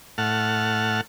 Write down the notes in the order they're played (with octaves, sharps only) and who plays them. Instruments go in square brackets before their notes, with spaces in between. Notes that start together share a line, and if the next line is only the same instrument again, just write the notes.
[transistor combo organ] A2 F#5 A5 F6